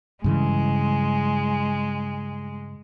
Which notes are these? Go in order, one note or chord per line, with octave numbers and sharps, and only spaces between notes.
G2 C#3 E3 G#3